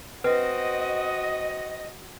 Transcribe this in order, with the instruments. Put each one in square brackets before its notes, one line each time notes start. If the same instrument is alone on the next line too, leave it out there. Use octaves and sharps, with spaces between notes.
[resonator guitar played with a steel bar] C4 [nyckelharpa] F#4 F#5 [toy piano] B4 [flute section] D#5